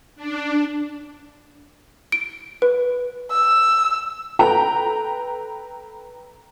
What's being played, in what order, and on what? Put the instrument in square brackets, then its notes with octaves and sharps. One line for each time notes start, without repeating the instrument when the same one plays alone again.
[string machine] D4
[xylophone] D7
B4
[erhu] E6
[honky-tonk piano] A4 B4 G5 A#5